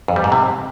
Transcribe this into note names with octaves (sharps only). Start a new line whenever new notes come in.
F2
G3
G#2
C3